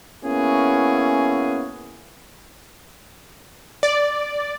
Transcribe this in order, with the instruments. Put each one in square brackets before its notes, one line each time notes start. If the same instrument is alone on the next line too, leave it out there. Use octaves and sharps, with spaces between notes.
[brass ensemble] A#3 B3 C#4 E4 F#4 G#4
[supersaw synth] D5